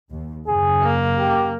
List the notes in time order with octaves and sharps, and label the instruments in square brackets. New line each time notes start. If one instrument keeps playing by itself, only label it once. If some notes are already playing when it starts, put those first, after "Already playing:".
[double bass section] D#2
[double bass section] F#2 C#3 [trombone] G#4
[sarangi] A#3
[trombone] G4